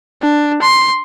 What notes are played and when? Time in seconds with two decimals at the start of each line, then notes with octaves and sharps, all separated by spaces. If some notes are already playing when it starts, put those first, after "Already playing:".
0.22 D4
0.62 C6